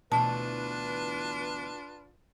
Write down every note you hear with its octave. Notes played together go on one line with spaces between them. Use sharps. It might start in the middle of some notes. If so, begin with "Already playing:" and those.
D2 B2 E3 D4 F4 B4 A5